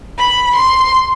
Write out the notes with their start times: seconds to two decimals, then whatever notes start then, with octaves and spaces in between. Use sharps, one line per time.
0.18 B5
0.56 C6